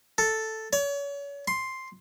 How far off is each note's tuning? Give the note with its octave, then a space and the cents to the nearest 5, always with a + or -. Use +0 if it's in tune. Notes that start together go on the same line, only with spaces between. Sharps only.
A4 +0
C#5 +35
C6 +5